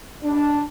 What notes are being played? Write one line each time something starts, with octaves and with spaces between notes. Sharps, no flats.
G2 D#3 G3 D4